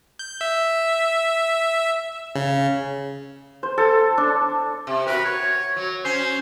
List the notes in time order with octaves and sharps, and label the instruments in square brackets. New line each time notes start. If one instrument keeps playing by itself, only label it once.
[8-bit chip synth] G6
E5
C#3
[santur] C5
A4
D4
[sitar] C3
[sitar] F#4 A#4 [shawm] B4
[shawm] C#5
[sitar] F#3
[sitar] C#4 [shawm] C5